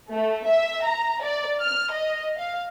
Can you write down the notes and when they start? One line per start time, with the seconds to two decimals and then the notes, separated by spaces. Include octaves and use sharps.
0.10 A3
0.47 E5
0.86 A#5
1.22 D5
1.59 F6
1.91 D#5
2.38 F5